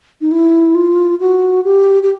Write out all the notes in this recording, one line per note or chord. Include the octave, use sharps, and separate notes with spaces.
D#4
E4
F4
F#4
G4
G4